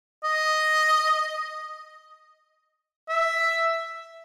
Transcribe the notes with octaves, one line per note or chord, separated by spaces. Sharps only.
D#5
E5